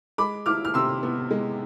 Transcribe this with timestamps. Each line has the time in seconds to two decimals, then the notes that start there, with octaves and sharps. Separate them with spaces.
0.18 G#3 B5 D6
0.46 E4 D6 F6
0.65 F6
0.74 C3 C6 E6
1.03 B3
1.31 G#3